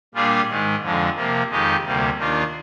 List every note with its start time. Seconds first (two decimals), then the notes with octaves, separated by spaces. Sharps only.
0.14 A#2 G3 D4 F4 G#4
0.48 G#2 D#3 G#3
0.83 F2 D3 F3 G#3
1.16 C3 F3 A#3
1.49 F2 D#3 G#3 D#4 G4
1.83 D2 C3 G3 A#3
2.16 D#2 D#3 A#3 D4 F4